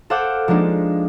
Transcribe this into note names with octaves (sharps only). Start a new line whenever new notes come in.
A4 C5 F5 F#5 D6 G6
F3 G#3 A#3 D4 D#4